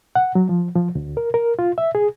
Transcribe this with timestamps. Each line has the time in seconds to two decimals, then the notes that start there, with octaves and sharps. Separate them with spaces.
0.15 F#5
0.35 F#3
0.49 F3
0.75 F3
0.95 D2
1.17 A#4
1.34 A#4
1.59 F4
1.78 E5
1.95 G#4